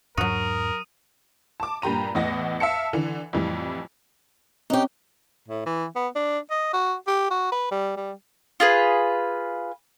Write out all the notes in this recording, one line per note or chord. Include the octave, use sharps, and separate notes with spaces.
E2 G#2 F#3 D4 F#4 A#4 D#6 D#7
A5 D6
G2 A#2 G4 A#5 D#7
E2 A2 D#5 F#5 A#6
E5 F5 A5 C#7
D3 E3
F2 A2 E3 G3
C4 C#4 D#4 G4 C#5
A2
E3
B3
D4
D#5
F#4
G4
F#4
B4
G3
G3
F4 G#4 B4